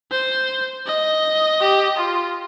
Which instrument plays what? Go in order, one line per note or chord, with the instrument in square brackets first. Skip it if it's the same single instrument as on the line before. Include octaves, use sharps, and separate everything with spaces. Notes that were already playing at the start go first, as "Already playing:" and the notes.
[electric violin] C5
D#5
[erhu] G4
F4